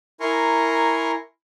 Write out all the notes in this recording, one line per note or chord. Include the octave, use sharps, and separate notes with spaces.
E4 A#4 G#5 A#5 C6 C#6